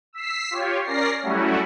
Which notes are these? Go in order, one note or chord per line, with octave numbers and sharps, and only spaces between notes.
E6 B6 C7
F4 G4 C#5
C#4 A#4 D5 A#6 C7
F#3 G3 A3 C#4 E4 F#4